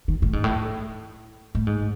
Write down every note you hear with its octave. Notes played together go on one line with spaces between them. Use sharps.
D#3
A2
G#2
A2
A2
G#2